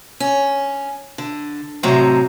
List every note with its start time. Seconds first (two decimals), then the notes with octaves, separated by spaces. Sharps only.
0.20 C#4
1.18 D3
1.83 A2 C3 F#3 C4 D#5 A#5